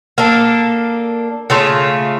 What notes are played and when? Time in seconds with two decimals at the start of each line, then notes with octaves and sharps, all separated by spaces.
0.18 A#3 D4 A4
1.50 C#3 A3 F4